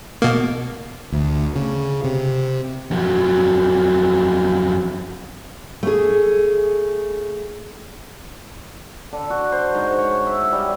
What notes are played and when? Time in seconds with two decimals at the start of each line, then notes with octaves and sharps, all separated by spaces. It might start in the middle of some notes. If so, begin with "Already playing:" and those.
0.22 B2 A#3
1.12 D2
1.55 C#3
2.04 C3
2.91 F2 F#3
5.83 A3 G#4
9.13 D3
9.30 F#4
9.52 C5
9.75 G#2
9.98 C#5
10.27 E5
10.53 G3